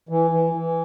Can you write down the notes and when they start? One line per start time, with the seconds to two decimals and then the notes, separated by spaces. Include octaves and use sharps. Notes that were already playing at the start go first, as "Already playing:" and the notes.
0.09 E3
0.31 E3
0.53 E3